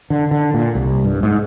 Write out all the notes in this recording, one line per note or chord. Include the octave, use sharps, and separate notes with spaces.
D3
D3
A#2
C2
G2
G#2